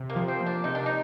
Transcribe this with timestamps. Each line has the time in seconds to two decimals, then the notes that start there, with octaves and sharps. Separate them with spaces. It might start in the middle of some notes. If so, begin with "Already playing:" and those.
Already playing: C3
0.10 A#3
0.16 F3
0.28 C4
0.40 A#3
0.46 D4
0.64 C3 D#4
0.75 D4
0.86 D#4